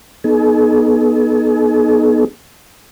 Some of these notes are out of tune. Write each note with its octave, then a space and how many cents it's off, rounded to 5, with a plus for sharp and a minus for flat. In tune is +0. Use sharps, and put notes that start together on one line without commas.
B3 -30 D#4 -20 G#4 +45